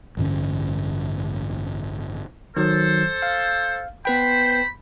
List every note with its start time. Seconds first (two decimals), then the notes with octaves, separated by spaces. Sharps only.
0.17 A1 G2 D3 C#4
2.57 D#3 F#3 A4 C5
3.22 F5
4.05 B3 B4 C5 G5 B5